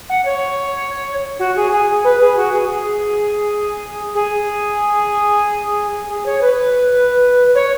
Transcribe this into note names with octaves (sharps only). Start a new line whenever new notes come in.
F#5
C#5
F#4
G#4
G#4
B4
G#4
F#4
G#4
G#4
G#4
G#4
C#5
B4
C#5